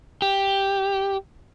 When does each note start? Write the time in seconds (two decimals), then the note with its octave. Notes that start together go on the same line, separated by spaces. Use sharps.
0.22 G4